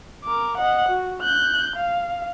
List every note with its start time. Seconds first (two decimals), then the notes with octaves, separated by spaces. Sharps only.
0.24 A#4 D6
0.58 D#5 F#5
0.89 F#4
1.21 F#6 G6
1.76 F5